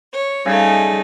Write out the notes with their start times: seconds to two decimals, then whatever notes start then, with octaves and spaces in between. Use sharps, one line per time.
0.13 C#5
0.46 C#3 G3 A3 D#4